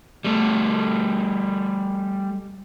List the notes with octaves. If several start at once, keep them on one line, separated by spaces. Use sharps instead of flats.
G3 A3